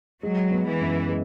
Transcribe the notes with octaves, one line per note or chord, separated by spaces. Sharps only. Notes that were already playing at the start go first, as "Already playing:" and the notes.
F#3 G#3
B3
E3
F#2
G#3